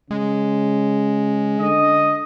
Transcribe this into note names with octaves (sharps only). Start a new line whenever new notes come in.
C#3 G#3
D3 D#5